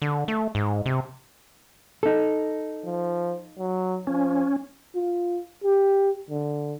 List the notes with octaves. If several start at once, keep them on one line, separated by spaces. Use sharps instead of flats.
D3
A3
G#2
C3
D#4 A4
F3
F#3
F3 C#4
F4
G4
D3